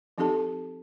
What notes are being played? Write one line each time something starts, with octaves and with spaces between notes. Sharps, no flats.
F3 C4 D#4 G4 A4 A5